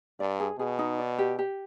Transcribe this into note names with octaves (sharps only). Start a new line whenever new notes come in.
G2 D5
G#4
B2 G#4
D#4
D5
G4
G4